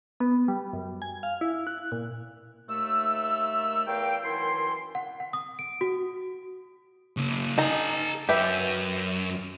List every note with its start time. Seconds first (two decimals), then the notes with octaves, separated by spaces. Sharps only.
0.20 B3
0.48 G3
0.73 F#2
1.02 G#5
1.23 F5
1.41 E4
1.67 F#6
1.92 A#2
2.69 D#2 A3 E6
3.87 E2 A#4 F5 G5
4.23 F#2 D#3 E3 E4 C6
4.95 F#5
5.20 F#5
5.33 D#6
5.59 D7
5.81 F#4
7.17 C#3 A#3
7.58 D#4 A4 G#5 A#5
8.29 F#2 G4 B4 E5